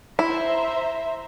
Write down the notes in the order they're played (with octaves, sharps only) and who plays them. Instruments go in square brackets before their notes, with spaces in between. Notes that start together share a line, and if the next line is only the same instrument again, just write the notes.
[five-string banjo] E4 [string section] C5 E5 A#5